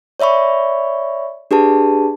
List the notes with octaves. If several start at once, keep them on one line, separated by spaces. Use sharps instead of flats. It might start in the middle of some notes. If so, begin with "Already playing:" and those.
C#5 D5 E5 B5 C#6
D4 G4 G#4 B4 A5